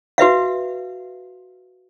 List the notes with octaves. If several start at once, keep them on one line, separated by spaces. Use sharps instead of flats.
F#4 B4 E5 F5